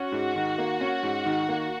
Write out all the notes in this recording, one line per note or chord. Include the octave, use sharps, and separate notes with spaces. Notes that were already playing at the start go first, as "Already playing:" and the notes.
Already playing: C#4 F#4
G#2
D#3
A#3
C#4
G#2
D#3
A#3